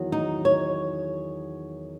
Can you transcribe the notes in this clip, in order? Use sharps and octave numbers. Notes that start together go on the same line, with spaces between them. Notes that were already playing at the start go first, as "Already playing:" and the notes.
Already playing: E2 D#3 F#3
D#4
C#5